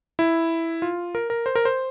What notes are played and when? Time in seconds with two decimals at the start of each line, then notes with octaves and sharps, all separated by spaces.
0.19 E4
0.82 F4
1.15 A#4
1.30 A#4
1.46 C5
1.55 A#4
1.65 C5